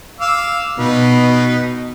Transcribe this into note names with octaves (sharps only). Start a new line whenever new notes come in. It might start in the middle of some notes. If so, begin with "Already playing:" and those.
F5 D6 E6
B2 D#4 B4